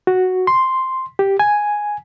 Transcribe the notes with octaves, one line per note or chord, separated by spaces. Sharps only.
F#4
C6
G4
G#5